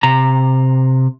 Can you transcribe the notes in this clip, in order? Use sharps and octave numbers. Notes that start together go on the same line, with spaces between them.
C3 A#5